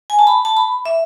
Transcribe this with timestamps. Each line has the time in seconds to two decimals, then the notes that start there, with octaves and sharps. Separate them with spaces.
0.10 G#5
0.19 A5
0.27 B5
0.45 A5
0.57 B5
0.86 E5